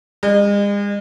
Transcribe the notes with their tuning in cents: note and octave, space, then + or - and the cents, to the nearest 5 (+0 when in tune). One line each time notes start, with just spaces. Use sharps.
G#3 -40